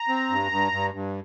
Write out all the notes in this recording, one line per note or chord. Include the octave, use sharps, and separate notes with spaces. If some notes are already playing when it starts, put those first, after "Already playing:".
Already playing: A#5
C4
G2
G2
G2
G2